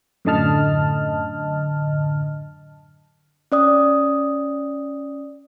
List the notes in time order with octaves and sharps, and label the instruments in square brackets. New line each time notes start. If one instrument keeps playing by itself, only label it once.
[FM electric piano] F#2 A2 D3 D#5 A5 F6
[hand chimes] C#4 D5 D#6